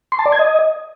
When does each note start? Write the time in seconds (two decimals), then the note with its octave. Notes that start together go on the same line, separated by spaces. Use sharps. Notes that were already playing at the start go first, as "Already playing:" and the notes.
0.12 C6
0.19 A5
0.26 D5
0.32 G#6
0.39 D#5